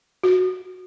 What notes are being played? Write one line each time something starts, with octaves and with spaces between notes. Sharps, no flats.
F#4